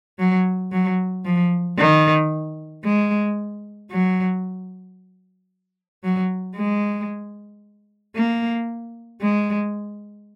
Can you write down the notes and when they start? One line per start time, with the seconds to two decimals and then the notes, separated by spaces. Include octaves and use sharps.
0.19 F#3
0.72 F#3
1.25 F3
1.78 D#3
2.84 G#3
3.91 F#3
6.04 F#3
6.56 G#3
8.16 A#3
9.22 G#3